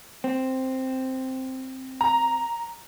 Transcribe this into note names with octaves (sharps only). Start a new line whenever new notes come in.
C4
A#5